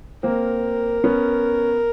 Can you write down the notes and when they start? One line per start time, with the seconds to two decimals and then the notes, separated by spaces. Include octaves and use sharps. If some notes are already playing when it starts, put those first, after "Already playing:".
0.23 A#3 C4 A#4
1.04 B3 C#4